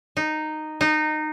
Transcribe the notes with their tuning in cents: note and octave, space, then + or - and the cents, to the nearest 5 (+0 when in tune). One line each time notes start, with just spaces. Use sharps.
D#4 -10
D#4 -20